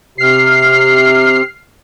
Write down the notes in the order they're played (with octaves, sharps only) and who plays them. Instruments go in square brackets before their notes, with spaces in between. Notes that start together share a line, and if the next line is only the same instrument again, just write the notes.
[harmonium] C3 [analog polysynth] F6 C7